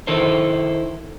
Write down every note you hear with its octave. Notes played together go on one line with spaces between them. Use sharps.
D#3 D#4 E4 A4 A#4 C5